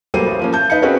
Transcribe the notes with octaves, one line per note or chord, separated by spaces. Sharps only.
F#3 G3 A3 A#3 C5 D#7
A1
F3 A#3 C#4
A5 G6
D#4 B4 F5 C#7
C4 C#4 F#4 G#4 A#4 B4